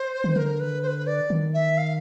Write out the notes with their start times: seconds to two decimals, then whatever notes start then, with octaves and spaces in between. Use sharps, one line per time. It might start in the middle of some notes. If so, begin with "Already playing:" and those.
Already playing: C5
0.24 D#3
0.36 D3 A#4
0.59 B4
0.82 C5
0.87 B4
1.06 D5
1.30 D#3
1.54 E5
1.77 F5